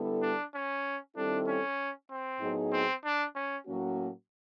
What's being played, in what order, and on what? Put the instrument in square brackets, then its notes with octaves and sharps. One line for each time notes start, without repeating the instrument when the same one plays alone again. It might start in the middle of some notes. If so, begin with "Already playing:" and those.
Already playing: [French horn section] D3 G3 B3 E4 A4
[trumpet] D4
C#4
[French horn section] D#3 G3 C4 E4 A4 [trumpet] D4
[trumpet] C#4
C4
[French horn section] A2 F#3 B3 D#4 G#4
[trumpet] C4
D4
C#4
[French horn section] A2 F#3 A#3 C#4 F#4